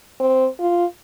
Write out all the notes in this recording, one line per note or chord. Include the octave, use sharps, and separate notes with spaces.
C4
F4